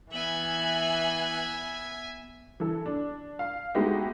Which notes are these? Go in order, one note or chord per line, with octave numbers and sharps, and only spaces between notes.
E3 B3 E5 G#5 F#7
E3 A4
D4
F5
G#3 A3 B3 D#4 F#4 G4